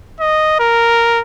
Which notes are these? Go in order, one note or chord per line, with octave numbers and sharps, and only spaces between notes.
D#5
A#4